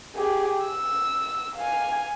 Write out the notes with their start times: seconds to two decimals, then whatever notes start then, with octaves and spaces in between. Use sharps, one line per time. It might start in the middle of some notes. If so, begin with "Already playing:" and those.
0.15 G4 G#4
0.66 E6
1.56 F5 G#5